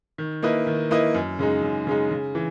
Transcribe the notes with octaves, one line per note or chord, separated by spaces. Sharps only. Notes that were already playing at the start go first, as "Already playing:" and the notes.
D#3
A#3 E4 B4 D#5
D#3
A#3 E4 B4 D#5
F#2
C#3 G#3 D#4
F#2
C#3 G#3 D#4
C#3
E3